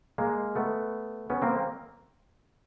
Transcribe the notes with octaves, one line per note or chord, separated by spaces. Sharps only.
G#3 A#3
A3 B3
B3 C#4
A#3 C4